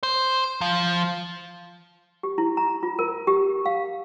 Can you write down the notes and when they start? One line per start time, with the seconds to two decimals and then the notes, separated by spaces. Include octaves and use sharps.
0.03 C5
0.61 F3
2.23 G4
2.38 E4
2.57 A#5
2.83 F4
2.99 A#4
3.27 G4
3.66 F5